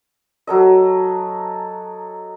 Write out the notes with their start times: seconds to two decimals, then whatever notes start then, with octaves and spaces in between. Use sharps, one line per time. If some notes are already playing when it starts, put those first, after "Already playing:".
0.47 F#3 A4 D#5